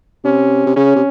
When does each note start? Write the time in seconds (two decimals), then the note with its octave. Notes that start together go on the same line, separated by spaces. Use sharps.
0.24 C3 C#4
0.66 C3
0.76 C#3 C#4
0.96 C3